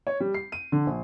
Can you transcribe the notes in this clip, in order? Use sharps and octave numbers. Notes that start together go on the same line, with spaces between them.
C#5
G3
C7
D#7
D3
A#1